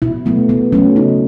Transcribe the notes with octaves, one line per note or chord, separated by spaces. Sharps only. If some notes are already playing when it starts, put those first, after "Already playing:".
B2 E4
F#3 A3 B3
B2 B3
F#3 A3 C#4
C#3 D#4